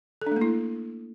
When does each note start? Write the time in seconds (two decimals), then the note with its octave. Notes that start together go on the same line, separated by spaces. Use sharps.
0.22 A4
0.26 D4
0.31 A3
0.36 A#3
0.41 E4